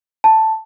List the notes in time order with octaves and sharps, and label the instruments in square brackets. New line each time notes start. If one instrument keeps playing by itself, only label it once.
[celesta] A5